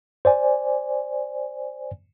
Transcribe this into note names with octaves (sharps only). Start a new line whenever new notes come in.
C5 D5 G#5